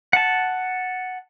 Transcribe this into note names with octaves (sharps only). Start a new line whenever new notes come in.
F#5 A5